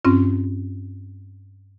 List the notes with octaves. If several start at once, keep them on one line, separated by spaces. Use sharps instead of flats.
G2 C4 C#4 F4